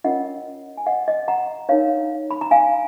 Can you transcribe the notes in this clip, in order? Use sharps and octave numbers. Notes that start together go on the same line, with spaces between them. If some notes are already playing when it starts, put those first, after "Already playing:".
C#4 F4 A#4 C#5 D#5 F#5
G#5
D#5 F#5
D#5
F#5 A#5
D#4 A#4 C#5 F5
B5
A#5
F5 G#5